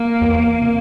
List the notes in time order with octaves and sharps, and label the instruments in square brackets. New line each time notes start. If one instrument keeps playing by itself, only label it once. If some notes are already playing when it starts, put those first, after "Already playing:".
Already playing: [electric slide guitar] A#3
[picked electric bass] E2
C3